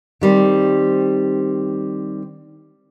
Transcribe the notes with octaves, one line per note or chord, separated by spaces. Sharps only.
D#3 G3 C4